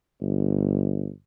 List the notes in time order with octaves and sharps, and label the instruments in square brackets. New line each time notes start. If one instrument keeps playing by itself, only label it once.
[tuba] G1